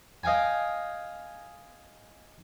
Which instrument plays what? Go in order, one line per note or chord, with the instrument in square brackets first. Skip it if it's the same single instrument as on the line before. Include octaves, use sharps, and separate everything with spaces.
[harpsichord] D#5 F5 G5 G#5